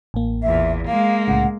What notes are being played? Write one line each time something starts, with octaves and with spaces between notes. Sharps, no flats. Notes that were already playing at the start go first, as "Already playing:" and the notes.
A1 A#3
E2 A#2 E5
G#3 A#3 F5
C2 A2 C#3 F#5